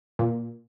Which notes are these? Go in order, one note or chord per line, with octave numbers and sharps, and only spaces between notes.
A#2